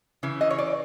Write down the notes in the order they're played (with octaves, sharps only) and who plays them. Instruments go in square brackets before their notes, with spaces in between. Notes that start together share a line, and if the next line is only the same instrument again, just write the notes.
[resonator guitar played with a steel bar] C#3 E3
D#5
C#5
D5